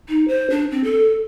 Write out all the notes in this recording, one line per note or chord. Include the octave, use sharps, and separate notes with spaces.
D#4
C5
D4
C4
A4